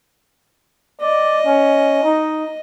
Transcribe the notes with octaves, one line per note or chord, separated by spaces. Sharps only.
D5 D#5
C#4
D#4